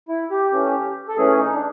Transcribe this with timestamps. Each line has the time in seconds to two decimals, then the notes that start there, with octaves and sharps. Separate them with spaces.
0.09 E4
0.31 G4
0.52 E3 A3 C#4
1.08 A4
1.17 E3 A3 C#4 G#4
1.39 D#4
1.54 D4